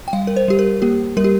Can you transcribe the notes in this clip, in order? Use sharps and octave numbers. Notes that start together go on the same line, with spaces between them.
G5
G3 F5
A#4
C5
G3 G4
A#4
A#3 G4
G3 A#4
G4